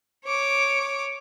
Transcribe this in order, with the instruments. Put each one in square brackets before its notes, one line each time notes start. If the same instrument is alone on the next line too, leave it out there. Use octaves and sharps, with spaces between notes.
[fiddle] C#5 D6